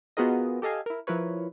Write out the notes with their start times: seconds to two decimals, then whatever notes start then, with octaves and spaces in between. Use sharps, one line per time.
0.17 B3 F4 F#4 G#4 A#4 D#5
0.62 G4 A4 D#5 F5 G#5
0.86 E4 A#4
1.07 F3 E4 A#4 B4 C#5